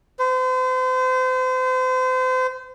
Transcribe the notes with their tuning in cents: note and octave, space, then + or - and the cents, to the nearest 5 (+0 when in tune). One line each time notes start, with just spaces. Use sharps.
C5 -35